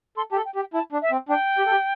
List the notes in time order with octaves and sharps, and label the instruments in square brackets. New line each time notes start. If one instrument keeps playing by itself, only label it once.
[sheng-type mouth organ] A4 [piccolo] C6
[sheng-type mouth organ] G4 [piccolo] A5
[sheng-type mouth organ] A4
[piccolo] G5
[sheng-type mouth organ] G4
[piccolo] G5
[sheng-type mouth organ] E4 [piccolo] A5
[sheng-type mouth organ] D4
[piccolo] E5
[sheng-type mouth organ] C4
[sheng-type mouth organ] D4 [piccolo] G5
[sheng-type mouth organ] G4
A4
G4